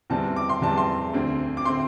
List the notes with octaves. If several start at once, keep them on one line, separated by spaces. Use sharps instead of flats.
E2 C3 G3 C4 A5
D6
C6
E2 C3 G3 C4 A5
C6
D2 D3 C4
D6
D3 C4 C6